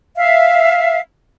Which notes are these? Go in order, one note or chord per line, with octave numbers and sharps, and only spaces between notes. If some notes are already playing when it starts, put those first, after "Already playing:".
E5 F5